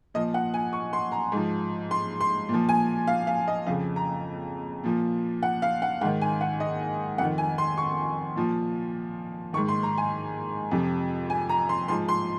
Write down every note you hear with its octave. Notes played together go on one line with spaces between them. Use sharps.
A#2 F3 D#5
F#5
G#5
C#6
C6
A#5
G#2 F3
C6
C6
A#2
F3
G#5
F5
F5
D#5
F2 C#3 F3 F5
A#5
A#2 F3
F#5
F5
F#5
G#2 D#3 F#5
G#5
F#5
D#5
F2 D#3 F#5
G#5
C6
C#6
A#2 F3
G#2 D#3 C#6
C6
A#5
G#5
F2 C3 F3
G#5
A#5
C6
G#2 F3 C6
C6